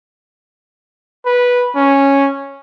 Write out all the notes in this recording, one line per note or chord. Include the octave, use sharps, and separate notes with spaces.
B4
C#4